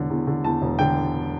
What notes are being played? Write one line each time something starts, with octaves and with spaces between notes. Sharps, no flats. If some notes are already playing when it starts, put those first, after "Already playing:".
Already playing: E1 D3
E2
D3
E2 A5
E1
D3 G5